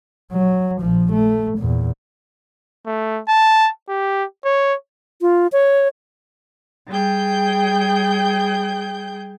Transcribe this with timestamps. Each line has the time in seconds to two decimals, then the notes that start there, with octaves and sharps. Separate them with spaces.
0.32 F#3
0.81 A#1 F3
1.12 A3
1.58 E2 A#2
2.86 A3
3.28 A5
3.89 G4
4.45 C#5
5.21 F4
5.52 C#5
6.89 G3 G#4 G5 G6